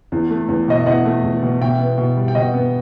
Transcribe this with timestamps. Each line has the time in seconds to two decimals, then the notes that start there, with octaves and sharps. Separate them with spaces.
0.12 E2
0.30 A3
0.49 E2
0.68 B2 D#5
0.79 E5
0.86 E2 D#5 F#5
1.05 A3
1.23 E2
1.43 B2
1.61 B2 E5 G5
1.79 B3
1.98 B2
2.17 G3
2.28 G5
2.35 B2 D#5 F#5
2.54 B3